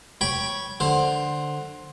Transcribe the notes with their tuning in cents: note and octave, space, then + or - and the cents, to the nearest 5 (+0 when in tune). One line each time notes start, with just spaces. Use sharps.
C#5 +0 G5 +0 B5 -15
D3 +10 C5 +10